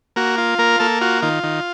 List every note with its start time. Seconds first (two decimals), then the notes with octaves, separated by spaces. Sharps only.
0.16 A#3 F#4
0.38 F4
0.59 A#3 A#4
0.80 A#3 A4
1.01 F4 F#4
1.22 D#3 F4
1.43 D#3